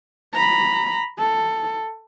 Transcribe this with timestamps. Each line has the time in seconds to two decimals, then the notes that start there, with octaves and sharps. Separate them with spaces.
0.34 A#5 B5
1.19 A4